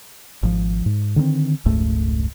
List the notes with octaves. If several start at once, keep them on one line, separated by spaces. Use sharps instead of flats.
G#1 F3
G#2
D3 D#3 B3 C4
F1 C#2 G#2 A3